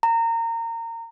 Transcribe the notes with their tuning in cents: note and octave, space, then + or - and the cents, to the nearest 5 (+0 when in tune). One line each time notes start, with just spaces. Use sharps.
A#5 -25